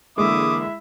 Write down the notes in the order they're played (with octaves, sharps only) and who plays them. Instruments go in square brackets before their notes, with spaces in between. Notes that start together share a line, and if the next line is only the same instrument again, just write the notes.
[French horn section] D3 E3 A#3 [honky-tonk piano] G#3 [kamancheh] E4 E5 [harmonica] D6 D#6